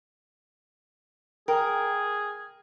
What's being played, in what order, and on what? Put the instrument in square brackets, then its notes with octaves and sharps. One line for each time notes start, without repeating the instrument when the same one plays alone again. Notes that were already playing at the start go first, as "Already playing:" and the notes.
[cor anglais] G#4 [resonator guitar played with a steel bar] A#4 [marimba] G5